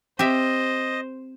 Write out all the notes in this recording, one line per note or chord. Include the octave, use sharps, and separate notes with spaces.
C4 G4 C5 D#5 E5